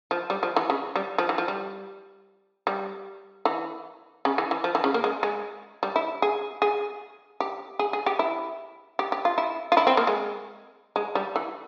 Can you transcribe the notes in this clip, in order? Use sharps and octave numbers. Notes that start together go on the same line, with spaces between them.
F3
G3
F3
E3
C#3
G3
F3
E3
F3
G3
G3
E3
C#3
E3
E3
F3
E3
C#3
A#3
G#3
G#3
G3
E4
G#4
G#4
G4
G#4
G#4
G4
E4
G4
G4
F4
E4
F4
E4
C4
A#3
G#3
G#3
G3
E3